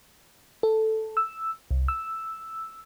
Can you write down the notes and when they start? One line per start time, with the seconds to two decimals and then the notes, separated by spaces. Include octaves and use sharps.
0.63 A4
1.17 E6
1.71 C2
1.88 E6